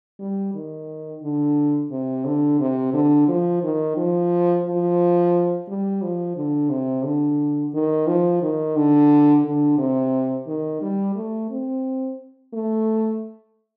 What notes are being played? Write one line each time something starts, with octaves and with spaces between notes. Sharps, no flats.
G3
D#3
D3
C3
D3
C3
D3
F3
D#3
F3
F3
G3
F3
D3
C3
D3
D#3
F3
D#3
D3
D3
C3
D#3
G3
A3
C4
A3